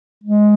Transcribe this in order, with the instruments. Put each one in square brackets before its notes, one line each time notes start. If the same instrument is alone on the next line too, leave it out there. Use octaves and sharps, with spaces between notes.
[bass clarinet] G#3